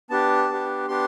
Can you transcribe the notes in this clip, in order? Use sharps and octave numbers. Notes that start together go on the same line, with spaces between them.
B3 D4 G4 A5
B3 D4 G4
B3 D4 G4 C6